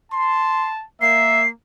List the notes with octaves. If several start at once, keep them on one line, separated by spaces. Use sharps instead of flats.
A5 C6
A#3 E5 C7